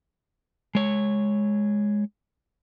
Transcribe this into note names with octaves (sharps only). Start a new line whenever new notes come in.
G#3 C#5